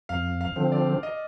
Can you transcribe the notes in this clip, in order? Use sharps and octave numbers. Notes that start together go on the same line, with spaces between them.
F2 F5
F5
D3 F3 C4
D5
D#5